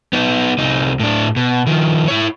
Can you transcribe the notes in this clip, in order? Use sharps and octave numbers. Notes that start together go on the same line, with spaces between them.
B3 D#4
C2 D#4
A2 D4
B2
D#3 F3
E4 C#5